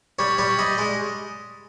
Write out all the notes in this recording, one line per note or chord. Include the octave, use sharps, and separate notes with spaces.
G3 C#5
G3 C#5
G3 D#5
G#3